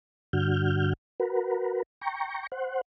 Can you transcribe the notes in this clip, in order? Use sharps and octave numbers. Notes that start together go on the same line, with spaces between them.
G2 D3 F#4 F6 G6
F#4 A#4 B4
G5 A#5 C#6
C5 F#5